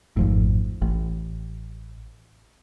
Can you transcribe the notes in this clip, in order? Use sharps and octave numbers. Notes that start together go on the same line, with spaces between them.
G#1 F2 A2
A1